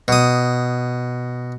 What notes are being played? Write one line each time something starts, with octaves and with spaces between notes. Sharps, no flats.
B2 D#6